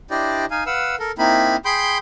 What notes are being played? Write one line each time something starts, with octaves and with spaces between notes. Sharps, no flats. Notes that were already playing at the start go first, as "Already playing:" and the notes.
D4 E4 G4 C5 D5 D#5
D#4 F5 G#5
B4 F5 F#5 E6
A4 A#4
A#3 C4 D#4 E4 B5
G#4 G5 B5 C6 G6